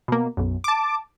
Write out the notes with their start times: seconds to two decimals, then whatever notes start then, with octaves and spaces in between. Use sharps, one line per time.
0.08 B2 A#3
0.37 B1 F#2
0.64 A5 D6